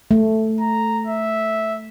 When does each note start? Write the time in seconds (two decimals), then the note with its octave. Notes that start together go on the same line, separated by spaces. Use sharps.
0.11 A3
0.60 A#5
1.07 E5